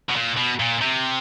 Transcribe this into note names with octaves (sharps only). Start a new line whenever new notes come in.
B2
A#2
B2
A#2
C3